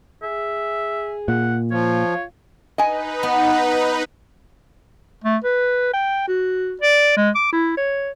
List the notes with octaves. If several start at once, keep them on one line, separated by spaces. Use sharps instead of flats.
G#4 E5
A#2 F#5
F3 F4 C#5
D#4 B4 D#5 G#5
B3
A3
B4
G5
F#4
D5
G#3
D6
E4
C#5